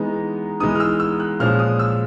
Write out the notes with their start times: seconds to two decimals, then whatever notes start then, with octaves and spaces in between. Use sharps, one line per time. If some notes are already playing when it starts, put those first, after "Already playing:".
Already playing: E3 G#3 B3 D#4 A#5
0.60 E3 G#3 B3 D#4 D#6
0.75 F6
0.80 E6
1.00 E6
1.20 F#6
1.40 A#2 F3 G#3 C#4 F6
1.59 D#6
1.79 E6